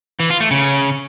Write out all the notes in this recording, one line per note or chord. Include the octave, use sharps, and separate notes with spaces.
E3
F4
A3
C#3